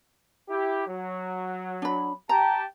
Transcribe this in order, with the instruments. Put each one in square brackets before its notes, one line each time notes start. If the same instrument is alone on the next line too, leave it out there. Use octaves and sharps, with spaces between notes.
[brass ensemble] E4 G4
F#3
[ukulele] D4 B5
[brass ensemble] G4 G5 A5 [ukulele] A#5